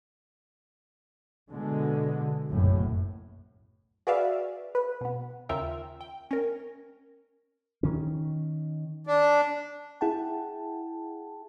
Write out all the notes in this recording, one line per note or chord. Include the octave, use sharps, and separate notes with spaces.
B2 D3 G#3
F#1 B1 F#2 A2
F#4 G#4 B4 D5 E5 F5
B4
B2 B3
D#2 C#3 F4 A#4 E5 G5
G5
C#4 A#4
D#3 C#4
D4
E4 G#4 F#5 G5 A5